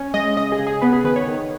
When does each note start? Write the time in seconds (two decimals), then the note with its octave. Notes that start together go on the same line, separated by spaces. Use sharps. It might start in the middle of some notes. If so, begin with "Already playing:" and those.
Already playing: C#4
0.14 G#3 D#5
0.36 C#3 D#5
0.52 G#4
0.59 C#3
0.67 G#4
0.82 B3 B4
0.93 G#4
1.04 D#3 B4
1.16 C#5
1.28 D#3